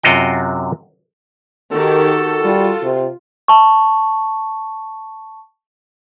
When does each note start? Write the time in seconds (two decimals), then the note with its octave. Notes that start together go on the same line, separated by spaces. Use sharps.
0.03 F#2 C3 F4 F#4 D#5 G5
1.72 D#3 F#4 G4 A4
2.44 G3 F4
2.83 C3
3.48 A5 C#6